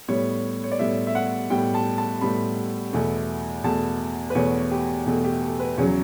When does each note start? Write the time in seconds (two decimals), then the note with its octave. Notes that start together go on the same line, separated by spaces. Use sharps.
0.08 A2 G3 B3 C#5
0.64 C#5
0.72 D5
0.79 A2 G3 B3 E5
1.07 E5
1.15 F#5
1.50 A2 G3 B3 G5
1.75 A5
1.98 A5
2.21 A2 G3 B3 B5
2.93 E2 B2 A3
3.64 E2 B2 A3 A5
4.30 B4
4.35 E2 B2 A3 C#5
4.71 G4
5.06 E2 B2 A3 A4
5.24 G4
5.42 A4
5.60 B4
5.78 E2 C#3 F#3 C#5